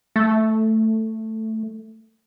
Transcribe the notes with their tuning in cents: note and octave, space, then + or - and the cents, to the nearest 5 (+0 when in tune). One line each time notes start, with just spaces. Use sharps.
A3 +5